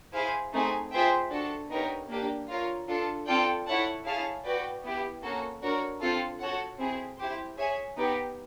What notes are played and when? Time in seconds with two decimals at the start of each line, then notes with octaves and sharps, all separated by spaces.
0.13 E4 G#4 C5 F5 G#5
0.52 A3 C4 D#4 G#4
0.92 F4 G#4 C5 E5 G5
1.30 D4 F#4 A4
1.70 B3 D#4 G4 A#4 C#5
2.09 A#3 D4 G4
2.48 F4 A#4 C#5
2.87 D4 F4 A4
3.26 C4 F4 A4 D5 G5
3.66 E4 A4 C#5 F#5 A5
4.05 E4 G#4 C#5 F5 A5
4.44 F#4 B4 D5 G5
4.83 B3 E4 G4
5.22 A#3 C#4 F#4 A4
5.62 D4 F#4 A#4 C#5
6.01 C4 F4 A4
6.40 F#4 A4 C#5 F#5
6.79 C4 E4 G#4
7.18 E4 G4 C5
7.57 G#4 C#5 E5 G#5
7.96 B3 D#4 G4